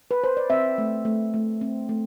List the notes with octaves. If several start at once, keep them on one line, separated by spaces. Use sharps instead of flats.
B4
C5
D5
C4 E5
A3
A3
A3
C4
A3